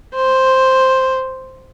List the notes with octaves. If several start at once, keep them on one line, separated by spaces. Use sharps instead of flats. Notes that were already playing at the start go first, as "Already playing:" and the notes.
C5